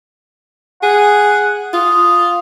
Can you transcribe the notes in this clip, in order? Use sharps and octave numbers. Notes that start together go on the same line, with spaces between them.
G#4 F#5
F4 D#6